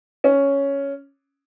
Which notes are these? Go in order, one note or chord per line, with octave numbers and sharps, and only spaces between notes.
C#4